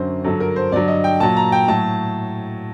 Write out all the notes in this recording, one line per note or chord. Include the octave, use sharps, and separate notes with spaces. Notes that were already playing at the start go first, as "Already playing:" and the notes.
Already playing: F#2 D3 F#3 C5
G2 D3 F#3 A4
A#4
C5
G2 D3 F#3 D5
D#5
G5
A#2 F#3 A5
A#5
G5
A2 F#3 A5